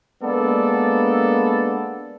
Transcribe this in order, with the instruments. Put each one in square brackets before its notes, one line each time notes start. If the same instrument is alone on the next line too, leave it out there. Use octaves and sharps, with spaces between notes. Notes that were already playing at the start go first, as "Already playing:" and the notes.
[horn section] G#3 A#3 B3 D4 A4 D5